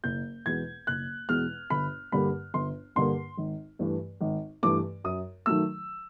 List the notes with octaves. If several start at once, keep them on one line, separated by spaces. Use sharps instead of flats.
F#1 G6
E2 B2 G#3 G#6
F#1 F#6
E2 B2 G#3 F6
G1 B5
G2 D3 G3 A#3 B5
G1 C6
G2 D3 G3 A#3 C6
G#1
G2 E3 A3
G#1
G2 E3 A3 D6
F#2 D#6
D#3 F#3 A3 E6